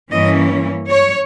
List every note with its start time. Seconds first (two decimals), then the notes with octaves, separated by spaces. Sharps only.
0.12 G2 E3 A#3 C#4 D#5
0.89 C#5